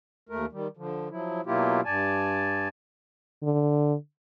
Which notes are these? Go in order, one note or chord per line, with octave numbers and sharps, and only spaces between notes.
D#2 A3 A#4
D#3 G3
D3 F3
F3 F#3 E4
B2 F#3 A#3 E4 F4 G4
G2 D5 G#5 A5
D3